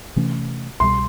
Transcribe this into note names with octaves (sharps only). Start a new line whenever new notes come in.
C3 E3 A3 C#4
C2 B2 G3 C6